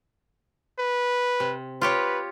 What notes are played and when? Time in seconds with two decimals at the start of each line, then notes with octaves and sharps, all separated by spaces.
0.79 B4
1.40 C3
1.81 F4 G4 B4 C#5